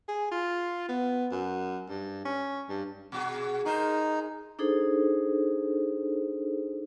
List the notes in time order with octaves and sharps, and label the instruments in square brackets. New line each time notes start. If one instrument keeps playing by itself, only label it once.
[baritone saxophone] G#4
F4
B3
F#2
G2
C#4
G2
[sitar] B2 F#4 G#4
[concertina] D#4 [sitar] G#4 A#4 C5
[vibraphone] D4 D#4 G#4 A4 C5